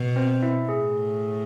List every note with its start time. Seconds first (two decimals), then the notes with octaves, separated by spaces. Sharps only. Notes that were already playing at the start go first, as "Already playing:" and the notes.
Already playing: B2
0.16 C4 C5
0.42 E4 E5
0.69 A2 G#4